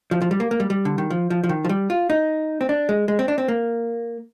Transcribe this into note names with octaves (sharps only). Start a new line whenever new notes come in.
F3
F3
G3
A#3
A#3
G3
G3
D3
D#3
F3
F3
F3
D#3
F3
G3
F4
D#4
C4
D4
G#3
G#3
C4
D4
C4
A#3